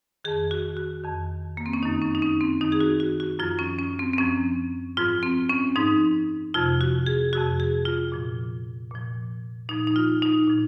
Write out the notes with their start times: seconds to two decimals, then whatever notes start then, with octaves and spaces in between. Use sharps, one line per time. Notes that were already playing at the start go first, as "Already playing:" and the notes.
0.24 F2 D#3 G#4
0.51 F#4
0.77 F#4
1.03 F2 D#3
1.57 A#3
1.66 C4
1.73 C#4
1.83 F#2 D#3 D#4
2.02 C#4
2.15 D#4
2.22 C#4
2.41 C4
2.61 F#2 D#3 D#4
2.72 G#4
2.80 F#4
3.00 F#4
3.20 F#4
3.39 F#2 F3 F4
3.59 C#4
3.79 C#4
3.99 C4
4.13 C4
4.18 F#2 F3 C#4
4.97 G#2 F3 F4
5.23 C4
5.49 C#4
5.76 G#2 F3 D#4
6.54 F2 C3 F3 F4
6.81 F#4
7.07 G#4
7.33 F2 C3 F3 F#4
7.60 G#4
7.85 F4
8.12 A#2 F3
8.91 A#2 F3
9.69 A#2 F3 D#4
9.87 D#4
9.96 F4
10.22 D#4
10.48 A#2 F3